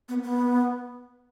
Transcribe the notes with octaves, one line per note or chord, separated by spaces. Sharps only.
B3
B3